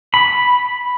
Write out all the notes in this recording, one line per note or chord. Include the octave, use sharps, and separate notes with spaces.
B5